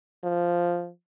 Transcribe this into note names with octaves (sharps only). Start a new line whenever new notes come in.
F3